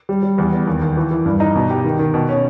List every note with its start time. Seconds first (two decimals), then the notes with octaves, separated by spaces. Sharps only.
0.09 G3
0.23 G3
0.38 E2
0.52 B3
0.67 D#2
0.82 D#2
0.97 E3
1.11 E3
1.26 G2
1.40 D#4
1.55 B2
1.70 G4
1.84 D#3
1.99 D#3
2.14 B2
2.29 C#4